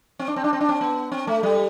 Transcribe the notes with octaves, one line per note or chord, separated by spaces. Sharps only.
C4
D4
C4
D4
C4
D4
C4
B3
C4
A3
G3